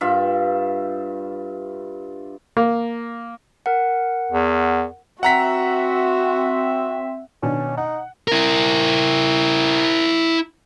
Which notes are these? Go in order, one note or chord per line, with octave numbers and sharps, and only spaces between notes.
G2 F4 E5
A#3
A#4 F#5
E2
C4 F#4 E5 F#5 A#5 B6
B2 D#3 C#4 D4
D#4 F#5
E4 A#4